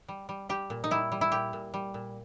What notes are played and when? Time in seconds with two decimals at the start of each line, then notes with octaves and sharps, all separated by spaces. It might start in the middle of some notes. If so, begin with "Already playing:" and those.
0.08 G3
0.29 G3
0.49 G3 G4
0.70 A#2
0.84 D#4
0.91 G3 E4
1.12 G3
1.21 E4
1.32 A#2 G4
1.53 A#2
1.74 G3
1.94 A#2